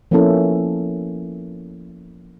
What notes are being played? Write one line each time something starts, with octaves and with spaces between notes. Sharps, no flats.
F3 A#3 B3 C#4 E4 A4